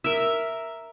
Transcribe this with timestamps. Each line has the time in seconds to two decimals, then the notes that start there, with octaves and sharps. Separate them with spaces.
0.04 A#4 E5